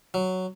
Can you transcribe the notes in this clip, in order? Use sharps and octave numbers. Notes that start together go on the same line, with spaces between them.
F#3